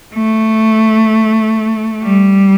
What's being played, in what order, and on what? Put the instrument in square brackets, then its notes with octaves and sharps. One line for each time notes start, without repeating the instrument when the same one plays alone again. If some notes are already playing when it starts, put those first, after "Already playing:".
[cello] A3
G3